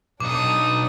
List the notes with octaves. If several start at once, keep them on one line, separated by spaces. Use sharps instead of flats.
B1 D4 D#4 D6 D#6